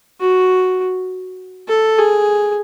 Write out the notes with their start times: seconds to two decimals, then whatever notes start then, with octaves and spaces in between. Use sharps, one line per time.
0.20 F#4
1.68 A4
1.98 G#4